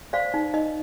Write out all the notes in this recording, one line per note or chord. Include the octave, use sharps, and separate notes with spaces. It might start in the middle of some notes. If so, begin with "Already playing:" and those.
C5 D5 F5
D#4
D#4 D#5